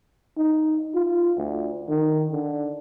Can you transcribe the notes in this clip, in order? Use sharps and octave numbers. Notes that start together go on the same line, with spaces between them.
D#4
F4
D2
D#3
D3